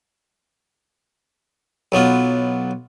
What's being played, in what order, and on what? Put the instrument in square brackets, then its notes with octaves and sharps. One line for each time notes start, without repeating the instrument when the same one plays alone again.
[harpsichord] B1 F#3 B3 F4